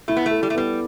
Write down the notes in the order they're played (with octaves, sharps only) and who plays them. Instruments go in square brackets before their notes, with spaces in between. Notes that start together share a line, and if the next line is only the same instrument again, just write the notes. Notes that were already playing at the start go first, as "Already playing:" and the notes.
[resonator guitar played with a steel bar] A3 [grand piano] E4
[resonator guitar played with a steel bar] B3
A3
[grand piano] A4
[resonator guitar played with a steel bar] G3
A3
[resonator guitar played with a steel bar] G3 [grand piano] B3